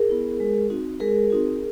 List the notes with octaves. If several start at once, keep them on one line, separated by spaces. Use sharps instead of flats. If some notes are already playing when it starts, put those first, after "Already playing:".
Already playing: G#4 A#4
B3 E4
G#3
C4 D#4 F#4
G#3 G#4 A#4
C4 D#4 F#4